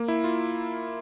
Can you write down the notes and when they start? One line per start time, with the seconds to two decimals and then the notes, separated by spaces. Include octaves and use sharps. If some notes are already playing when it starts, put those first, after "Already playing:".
Already playing: A#3
0.08 E4
0.24 F4